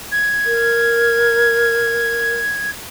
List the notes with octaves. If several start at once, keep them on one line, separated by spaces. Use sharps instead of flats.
G#6
A#4